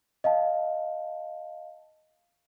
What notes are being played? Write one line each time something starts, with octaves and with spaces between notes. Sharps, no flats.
D#5 F5 A5